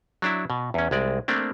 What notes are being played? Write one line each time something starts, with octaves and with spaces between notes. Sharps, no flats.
F#3 D4 E4
B2
E2 C#4
C2 G#3 D5
A3 A#3 C4 D4